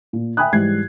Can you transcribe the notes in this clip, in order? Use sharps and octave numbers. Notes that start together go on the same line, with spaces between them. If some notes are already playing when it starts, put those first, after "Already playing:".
A#2
E5 G5 G#5 B5 D#6 F#6
G#2 E3 G3 G4 G#6 C7